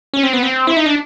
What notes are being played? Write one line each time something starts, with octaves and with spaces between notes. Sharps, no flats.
C#4
C4
B3
C4
E4
D#4
D4